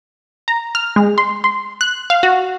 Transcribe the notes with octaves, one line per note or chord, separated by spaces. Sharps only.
A#5
F6
G#3
C6
C6
F#6
F5
F#4